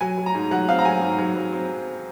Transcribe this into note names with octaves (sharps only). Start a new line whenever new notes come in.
F#3 G#5
F#3
A#5
G#2
F#3 F#5
C4 F5
A#5
F#3 G#5
G#2
F#3
F#3
C4